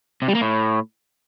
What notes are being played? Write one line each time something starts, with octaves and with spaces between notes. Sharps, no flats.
C3
G3
A#3
A2